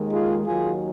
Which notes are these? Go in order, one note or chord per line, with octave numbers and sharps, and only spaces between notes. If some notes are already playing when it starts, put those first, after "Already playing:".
Already playing: D#2 D#3 G#3
F4 G#4
D#2 D#3 F#3 F4 G#4